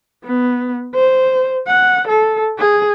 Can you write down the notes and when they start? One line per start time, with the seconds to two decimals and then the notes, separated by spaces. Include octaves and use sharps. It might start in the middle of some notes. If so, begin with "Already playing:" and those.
0.24 B3
0.95 C5
1.67 F#5
2.08 A4
2.59 G#4